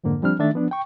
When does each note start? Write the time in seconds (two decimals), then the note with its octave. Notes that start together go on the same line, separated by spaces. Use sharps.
0.04 F2 G#2 D3 A#3
0.22 F3 G3 C4 D4 F6
0.39 D#3 A3 D4 E5 A6
0.53 F3 B3 D4
0.71 G5 C#6